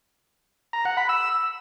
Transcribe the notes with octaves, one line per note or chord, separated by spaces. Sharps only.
A#5
F#5
B5
E6